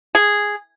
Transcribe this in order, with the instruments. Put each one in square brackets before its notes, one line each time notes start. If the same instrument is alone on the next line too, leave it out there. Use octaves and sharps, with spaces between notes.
[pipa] G#4